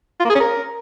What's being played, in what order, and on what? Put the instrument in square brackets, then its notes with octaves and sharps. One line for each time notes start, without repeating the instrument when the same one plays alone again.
[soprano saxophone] F4
A#3
G#4
C#4
A#4